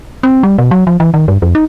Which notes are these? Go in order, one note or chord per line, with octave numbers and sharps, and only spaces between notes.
C4
G3
B2
F#3
F3
E3
D#3
G2
F2
D#4